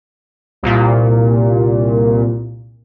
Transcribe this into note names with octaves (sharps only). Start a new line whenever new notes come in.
C2 A#2